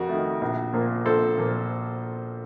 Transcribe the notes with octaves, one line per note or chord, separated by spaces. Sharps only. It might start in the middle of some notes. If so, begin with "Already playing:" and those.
Already playing: F2 F#4 A#4
D#3 A3
A#1
A#2 F3 A#3
A#1 A4 C5
A#2 F3 A#3